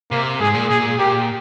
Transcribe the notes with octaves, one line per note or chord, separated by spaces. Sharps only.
C3 A#3
G#2 G#4
A#2
A#2 G#4
A#2 G4